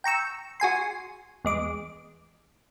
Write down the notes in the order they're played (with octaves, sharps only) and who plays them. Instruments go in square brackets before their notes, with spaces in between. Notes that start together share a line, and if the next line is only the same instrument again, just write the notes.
[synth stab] G5 A#5 C#6 E6
F#4 G#4 G#5 C6
E2 G#3 D6